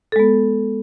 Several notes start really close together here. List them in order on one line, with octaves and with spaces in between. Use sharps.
A4 G#3 B3